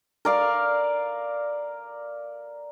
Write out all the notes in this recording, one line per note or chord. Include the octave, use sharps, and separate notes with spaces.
A#4 D5 F5